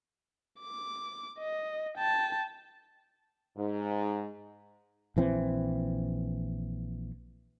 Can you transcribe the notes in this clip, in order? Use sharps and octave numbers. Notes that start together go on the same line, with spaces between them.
D6
D#5
G5 A5
G#2
A#1 E3 C4